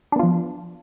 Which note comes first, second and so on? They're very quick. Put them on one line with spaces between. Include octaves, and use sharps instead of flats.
D4 B3 F4 F3